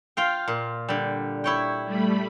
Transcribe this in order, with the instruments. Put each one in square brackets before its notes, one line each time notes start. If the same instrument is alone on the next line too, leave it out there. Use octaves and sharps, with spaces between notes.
[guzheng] F4 F5 G5
A#2
D3 G3
E4 C#5 G5
[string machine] G3 A3 B5